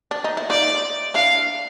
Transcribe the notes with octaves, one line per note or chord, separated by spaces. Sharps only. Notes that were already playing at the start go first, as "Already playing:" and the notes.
D4
D#4
E4
D#4 F4 D5
D4 E4 F5